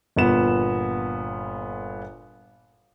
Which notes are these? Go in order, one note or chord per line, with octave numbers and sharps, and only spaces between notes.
G1 A#2 B3 E7